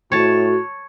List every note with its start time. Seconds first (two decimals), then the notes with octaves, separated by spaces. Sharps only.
0.12 A2 F#4 C#5 A5